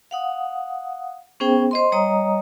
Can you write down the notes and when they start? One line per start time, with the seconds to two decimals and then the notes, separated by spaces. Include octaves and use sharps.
0.11 F5 F#5 D#6
1.40 B3 C#4 G#4 C5 G5
1.71 C5 D#5 C6
1.92 G3 C#5 D#5 A#5 D#6